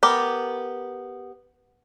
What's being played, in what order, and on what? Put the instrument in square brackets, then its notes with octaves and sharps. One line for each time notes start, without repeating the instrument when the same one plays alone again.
[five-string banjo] B3 G4 A#4